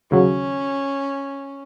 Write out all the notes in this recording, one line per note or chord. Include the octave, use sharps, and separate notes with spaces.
D#2 C#3 F#3 C#4